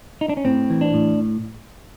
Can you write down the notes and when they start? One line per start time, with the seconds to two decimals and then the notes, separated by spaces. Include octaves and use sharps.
0.21 D#4
0.29 D4
0.37 C#4
0.45 A2 C4
0.70 E3
0.81 D4
0.94 A2